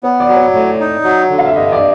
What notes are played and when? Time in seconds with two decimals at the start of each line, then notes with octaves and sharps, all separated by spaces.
0.03 B3 C#5
0.20 D5
0.28 F#3
0.36 C#5
0.53 A2
0.80 D#4
1.04 F#3
1.30 D3
1.38 F5
1.46 E5
1.55 G2 D#5
1.72 D5